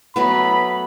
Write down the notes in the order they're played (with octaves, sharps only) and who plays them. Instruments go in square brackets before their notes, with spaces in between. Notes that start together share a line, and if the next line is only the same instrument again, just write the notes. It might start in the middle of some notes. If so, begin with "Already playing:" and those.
[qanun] F#3 A3 B3 [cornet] B5